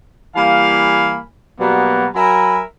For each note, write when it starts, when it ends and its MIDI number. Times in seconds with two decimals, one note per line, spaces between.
0.36 1.21 52
0.36 1.21 55
0.36 1.21 58
0.36 1.21 77
0.36 1.21 80
0.36 1.21 83
1.60 2.07 47
1.60 2.07 54
1.60 2.07 55
1.60 2.07 58
1.60 2.07 59
2.15 2.62 54
2.15 2.62 70
2.15 2.62 76
2.15 2.62 80
2.15 2.62 83